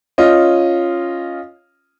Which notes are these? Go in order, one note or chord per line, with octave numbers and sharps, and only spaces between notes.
C#4 F4 D#5